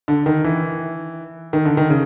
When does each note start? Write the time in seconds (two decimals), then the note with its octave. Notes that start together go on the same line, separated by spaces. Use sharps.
0.08 D3
0.26 D#3
0.44 E3
1.53 D#3
1.65 D3
1.77 D#3
1.90 C#3